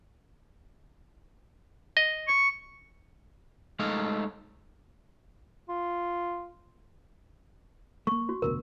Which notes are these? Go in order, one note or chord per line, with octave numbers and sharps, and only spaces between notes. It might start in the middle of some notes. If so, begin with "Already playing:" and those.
D#5
C#6
G#3 A3 D#4 A4 F5
F4
A3 A#3 C#6
F#4
F1 D2 B2 A#4